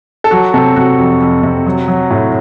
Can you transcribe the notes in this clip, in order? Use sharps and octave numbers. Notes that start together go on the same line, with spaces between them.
A4
F#3 F#4
C3 A4
C3 F#4
F2
F2
C3
F#3
F#3
A2